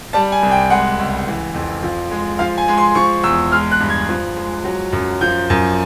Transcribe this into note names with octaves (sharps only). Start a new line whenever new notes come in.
G3 A5
G#5
C2
G5
G#3 F#5
C#2
E3
F2
F3
G#3
F3 F5
G#5
G#3
C6
F3 C#6
E2 E6
G#3 F6
F#6
G2
G#6
F3
G#3
F#3
F#2
F3 G6
F#2